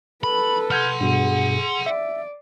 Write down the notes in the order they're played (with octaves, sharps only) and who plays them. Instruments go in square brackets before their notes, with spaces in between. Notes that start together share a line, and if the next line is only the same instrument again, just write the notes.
[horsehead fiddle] A4 B4 [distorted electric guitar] B5
[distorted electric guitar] F#5 C6 [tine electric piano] F6 G6 G#6
[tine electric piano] G2 B2 [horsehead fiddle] G#4
[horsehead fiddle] D5 [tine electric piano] E5